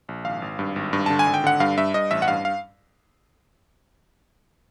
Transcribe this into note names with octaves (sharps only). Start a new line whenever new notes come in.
A#1
G#1 F5
G#1
G2
G#1
G2
D3 A5
G#5
G#1
G5
D3 F#5
G2 F5
G2 E5
G2 D#5
A1 E5
F#5
G2 F5
F5